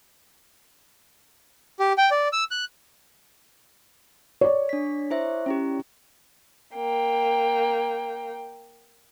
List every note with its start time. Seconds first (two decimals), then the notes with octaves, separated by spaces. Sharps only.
1.79 G4
1.98 G5
2.11 D5
2.33 E6
2.51 F#6
4.41 C#5 D5
4.69 D4 B6
5.11 E4 C5 E5
5.46 C#4 E4 G4
6.75 A#3 G5